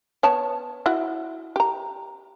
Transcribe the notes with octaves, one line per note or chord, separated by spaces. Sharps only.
B3 C#5 A5
E4 F#4
G4 A#5